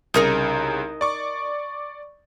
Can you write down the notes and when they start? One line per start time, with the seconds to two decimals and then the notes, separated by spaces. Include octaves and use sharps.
0.14 C2 C#3 D#4 A#4 D#5
1.01 D5 C#6 D6